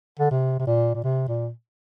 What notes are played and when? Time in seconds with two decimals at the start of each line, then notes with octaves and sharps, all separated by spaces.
0.20 D3
0.31 C3
0.59 C3
0.67 A#2
0.94 A#2
1.04 C3
1.28 A#2